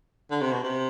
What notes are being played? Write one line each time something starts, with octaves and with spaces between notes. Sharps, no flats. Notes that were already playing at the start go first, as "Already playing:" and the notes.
D3
C3
B2
C3